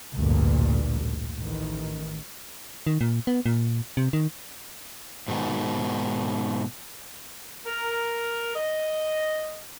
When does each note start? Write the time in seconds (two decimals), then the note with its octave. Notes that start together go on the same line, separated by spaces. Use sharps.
0.14 A1 D2 G2 A#2
1.40 A1 D#3
2.87 D#3
3.01 A#2
3.27 B3
3.46 A#2
3.97 C3
4.13 D#3
5.28 G#2 B2 D#3
7.65 A#4
8.55 D#5